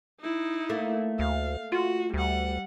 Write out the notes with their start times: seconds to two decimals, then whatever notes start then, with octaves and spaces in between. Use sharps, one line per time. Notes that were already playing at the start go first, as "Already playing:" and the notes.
0.20 D#4 E4
0.69 A3 A#3
1.19 D2 F5
1.72 F4 F#4
2.14 D2 G3 F#5